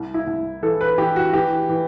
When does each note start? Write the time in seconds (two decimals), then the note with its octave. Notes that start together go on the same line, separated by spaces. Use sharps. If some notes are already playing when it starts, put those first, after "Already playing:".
Already playing: C2
0.14 E4
0.27 C2
0.62 E3 A4
0.81 B4
0.98 E3 G4
1.16 F#4
1.33 E3 G4
1.69 E3